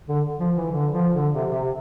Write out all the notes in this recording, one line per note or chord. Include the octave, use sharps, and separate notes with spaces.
D3
F3
E3
D3
F3
D3
C3
C3